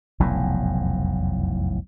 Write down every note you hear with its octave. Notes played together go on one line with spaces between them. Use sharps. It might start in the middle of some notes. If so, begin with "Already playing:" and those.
F1 B1 E2 A2